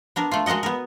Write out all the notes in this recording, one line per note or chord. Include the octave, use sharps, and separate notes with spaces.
B3 D4 A#4
A3 F4
G#3 F#4 A#4 D#5 F#5
B3 A#4